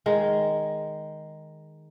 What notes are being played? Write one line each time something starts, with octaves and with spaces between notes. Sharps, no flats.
D#3 G#3